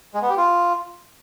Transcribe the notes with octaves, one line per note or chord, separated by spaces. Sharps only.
G#3
B3
G4
F4